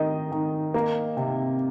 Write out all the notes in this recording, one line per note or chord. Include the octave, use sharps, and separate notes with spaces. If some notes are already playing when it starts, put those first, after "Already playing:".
Already playing: D#3 D#4 D#5
D#3
A#3
C3